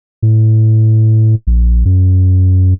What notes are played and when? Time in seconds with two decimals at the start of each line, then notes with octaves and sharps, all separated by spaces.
0.22 A2
1.47 A#1
1.85 F#2